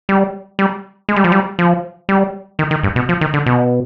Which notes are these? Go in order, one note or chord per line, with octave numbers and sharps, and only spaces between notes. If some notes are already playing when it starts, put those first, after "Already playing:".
G3
G3
G#3
G3
F3
G3
F3
G3
D#3
D#3
G2
B2
F3
D#3
D3
B2